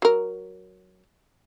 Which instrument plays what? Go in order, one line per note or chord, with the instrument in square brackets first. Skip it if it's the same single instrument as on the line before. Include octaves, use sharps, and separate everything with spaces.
[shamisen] F#3 A#4